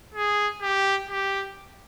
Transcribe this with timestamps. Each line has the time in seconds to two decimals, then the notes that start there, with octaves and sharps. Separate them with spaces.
0.14 G#4
0.62 G4
1.10 G4